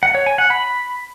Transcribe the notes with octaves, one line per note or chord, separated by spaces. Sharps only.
F#5
C#5
G#5
F#5
B5